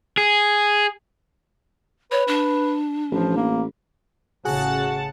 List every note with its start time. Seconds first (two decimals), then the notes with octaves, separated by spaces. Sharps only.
0.18 G#4
2.12 B4 C#5
2.28 D4
3.12 A1 F3
3.37 A#3
4.45 A1 C#3 F#4 G#4 F#5 A5